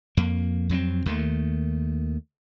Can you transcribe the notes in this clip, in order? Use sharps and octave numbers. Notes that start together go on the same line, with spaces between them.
F2 A#3
F2 F#3 A#3 C4
D#2 D#3 A3